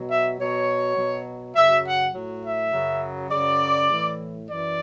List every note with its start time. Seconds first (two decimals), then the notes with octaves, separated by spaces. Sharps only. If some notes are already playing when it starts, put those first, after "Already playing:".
Already playing: B2 F#3
0.10 E5
0.40 B2 F#3 C#5
0.97 B2 F#3
1.56 F#2 C#3 F#3 E5
1.85 F#5
2.14 A2 F#3
2.43 E5
2.73 F#2 C#3 F#3
3.30 F#2 C#3 F#3 D5
3.89 A2 E3
4.48 F#2 E3 D5